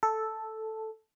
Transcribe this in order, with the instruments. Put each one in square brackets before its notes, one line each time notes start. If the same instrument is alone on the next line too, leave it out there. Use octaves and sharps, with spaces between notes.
[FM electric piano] A4